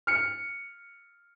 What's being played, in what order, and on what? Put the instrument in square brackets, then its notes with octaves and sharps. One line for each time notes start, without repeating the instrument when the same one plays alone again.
[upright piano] F6 C#7